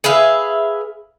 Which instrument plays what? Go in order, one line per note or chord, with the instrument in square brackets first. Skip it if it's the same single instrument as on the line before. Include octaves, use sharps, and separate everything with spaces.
[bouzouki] G#4 B4 E5 F5